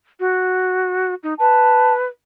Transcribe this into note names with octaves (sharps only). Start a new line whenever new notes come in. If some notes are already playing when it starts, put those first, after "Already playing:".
F#4
D#4
B4 A5